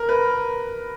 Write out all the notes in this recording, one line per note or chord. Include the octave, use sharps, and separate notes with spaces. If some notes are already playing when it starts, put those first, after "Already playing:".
Already playing: A#4
B4